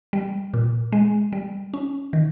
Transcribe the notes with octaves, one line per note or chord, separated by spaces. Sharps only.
G3
A#2
G#3
G3
C#4
D#3